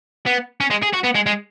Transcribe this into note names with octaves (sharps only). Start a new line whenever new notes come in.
B3
C#4
G#3
G#4
F#4
B3
G#3
G#3